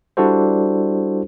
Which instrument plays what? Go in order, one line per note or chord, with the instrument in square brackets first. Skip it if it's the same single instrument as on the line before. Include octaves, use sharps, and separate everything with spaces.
[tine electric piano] G3 D4 E4 F#4 A4 C5